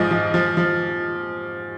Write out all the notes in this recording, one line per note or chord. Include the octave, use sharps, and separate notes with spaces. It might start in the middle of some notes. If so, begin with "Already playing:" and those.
Already playing: G#2 F3 D#5
F3
F3
F3